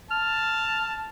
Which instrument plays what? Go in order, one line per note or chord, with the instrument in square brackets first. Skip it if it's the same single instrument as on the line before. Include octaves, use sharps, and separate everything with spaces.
[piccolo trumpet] A5 [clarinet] F6